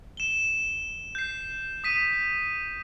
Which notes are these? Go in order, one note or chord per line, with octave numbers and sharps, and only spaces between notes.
E7 G7
G6 C7
D#6 B6 D#7